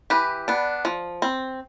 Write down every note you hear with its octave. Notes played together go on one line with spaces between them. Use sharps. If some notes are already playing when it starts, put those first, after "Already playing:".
E3 G4 B4
B3 D4
F3
C4